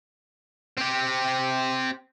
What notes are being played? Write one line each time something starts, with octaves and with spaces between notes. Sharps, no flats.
C4 G4